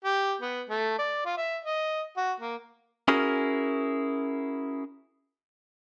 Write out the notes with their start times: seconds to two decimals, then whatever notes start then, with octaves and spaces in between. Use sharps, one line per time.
0.04 G4
0.41 B3
0.69 A3
0.99 D5
1.25 F4
1.37 E5
1.64 D#5
2.17 F#4
2.40 A#3
3.08 C#4 E4 F#4 G#4 A#4